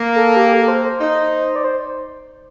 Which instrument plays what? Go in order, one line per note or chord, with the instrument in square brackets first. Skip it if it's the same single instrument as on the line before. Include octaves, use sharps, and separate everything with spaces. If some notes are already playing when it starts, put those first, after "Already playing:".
Already playing: [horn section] A#3
[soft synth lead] A4
G4
A4
C5
C5
[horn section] D#4
[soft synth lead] D5
C5